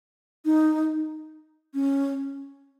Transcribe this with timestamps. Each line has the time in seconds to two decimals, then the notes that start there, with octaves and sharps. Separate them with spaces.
0.45 D#4
1.74 C#4